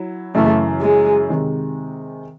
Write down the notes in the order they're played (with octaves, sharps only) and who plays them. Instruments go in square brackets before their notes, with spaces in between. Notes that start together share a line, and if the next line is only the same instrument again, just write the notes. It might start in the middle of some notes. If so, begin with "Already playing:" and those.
Already playing: [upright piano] F#3 E4
[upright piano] F#2 C#3 E3 [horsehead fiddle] A3
[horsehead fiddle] G#3
[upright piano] C3 D#3 G#3